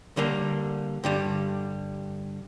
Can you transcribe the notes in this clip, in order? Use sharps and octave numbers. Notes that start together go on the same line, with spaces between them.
D3 G3 A#3
G2 D3 G3